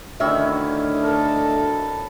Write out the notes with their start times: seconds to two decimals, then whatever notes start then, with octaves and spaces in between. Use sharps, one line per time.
0.20 D2 D#3 C#4 D#4 E4 E5
1.03 A4 A#4